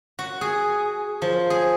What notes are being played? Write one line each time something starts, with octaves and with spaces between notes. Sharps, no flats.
F#4
G#4
F3
G#4